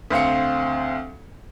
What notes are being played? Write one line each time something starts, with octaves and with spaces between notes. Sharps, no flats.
D2 C4 F5 C#7